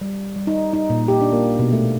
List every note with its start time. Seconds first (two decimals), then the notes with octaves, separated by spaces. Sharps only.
0.01 G3
0.36 G3
0.47 D#4
0.73 D#4
0.90 A#2
1.08 G4
1.21 D4
1.33 A#3
1.59 B2
1.73 A3